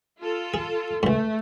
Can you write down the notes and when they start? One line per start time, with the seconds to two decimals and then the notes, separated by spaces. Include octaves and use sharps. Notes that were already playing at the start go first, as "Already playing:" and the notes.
0.20 F4 A4
0.54 G#4
1.03 C#2 G#2 A3